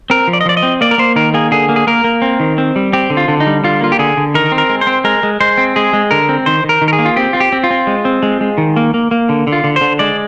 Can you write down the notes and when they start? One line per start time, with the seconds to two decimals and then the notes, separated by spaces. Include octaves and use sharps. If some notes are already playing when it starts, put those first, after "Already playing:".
0.10 C4 A#4
0.27 F3
0.33 D5
0.41 D#5
0.46 F3 D5
0.57 D#5
0.63 C4
0.81 A#3 D5
0.91 A#4
0.98 A#3 C5
1.16 D#3 A#4
1.34 A#3 G#4
1.51 D3 G#4
1.69 A#3
1.76 G#4
1.87 A#3 A#4
2.04 A#3
2.22 C4
2.40 D#3
2.58 C4
2.76 G3
2.93 C4 G4
3.10 D3
3.17 F4
3.28 D3
3.40 D#4
3.47 G3
3.64 D3 F4
3.81 A#3 F4
3.92 G4
3.99 D3 G#4
4.17 D3
4.34 D#3 A#4
4.52 C4
4.58 A#4
4.69 G#3
4.81 C5
4.87 C4
5.04 G#3 A#4
5.23 G#3
5.40 G#3 C5
5.58 C4
5.76 G#3 G#4
5.93 G#3
6.11 D3 A#4
6.29 C4
6.46 D#3 C5
6.64 D#3
6.69 A#4
6.82 D#3
6.88 A#4
6.93 G#4
6.99 A#3
7.05 F4
7.16 C4 G4
7.33 C4 F4
7.40 G4
7.52 C4
7.64 F4
7.70 C4
7.87 G#3
8.05 C4
8.23 G#3
8.41 G#3
8.58 D#3
8.76 A#3
8.94 A#3
9.11 A#3
9.29 D3
9.47 D3
9.52 F4
9.64 D3
9.76 C5
9.81 D3
9.99 G#3 D5